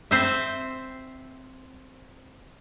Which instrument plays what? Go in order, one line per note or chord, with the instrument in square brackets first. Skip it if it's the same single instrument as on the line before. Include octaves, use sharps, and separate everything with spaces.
[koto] C4 C5 E5